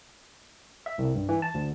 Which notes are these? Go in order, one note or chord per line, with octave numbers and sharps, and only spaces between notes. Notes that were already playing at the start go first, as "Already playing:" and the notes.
E5
C2
G2
E3
A5
D2